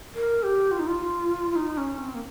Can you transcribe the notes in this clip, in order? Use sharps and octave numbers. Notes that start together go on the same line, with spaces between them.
A#4
G4
F4
D#4
F4
F4
D#4
C#4
C4
A#3